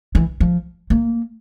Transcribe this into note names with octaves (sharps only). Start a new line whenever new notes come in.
E3
F3
A#3